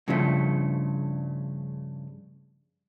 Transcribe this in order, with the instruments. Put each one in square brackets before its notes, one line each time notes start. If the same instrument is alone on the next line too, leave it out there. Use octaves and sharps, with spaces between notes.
[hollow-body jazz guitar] G2 C#3 F3 G3 A3